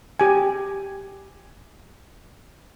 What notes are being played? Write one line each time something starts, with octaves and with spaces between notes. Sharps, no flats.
G4 G#5